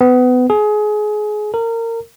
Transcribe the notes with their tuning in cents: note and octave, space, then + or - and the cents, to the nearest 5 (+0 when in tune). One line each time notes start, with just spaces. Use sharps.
B3 +25
G#4 +25
A#4 -25